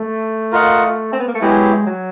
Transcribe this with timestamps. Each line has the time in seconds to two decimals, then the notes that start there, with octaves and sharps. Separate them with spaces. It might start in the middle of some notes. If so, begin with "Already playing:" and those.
Already playing: A3
0.52 F4 A#4 D#5 F#5
1.12 C4
1.19 B3
1.27 A#3
1.34 A3
1.41 F#3 G#3 B3 E4 G4
1.86 F#3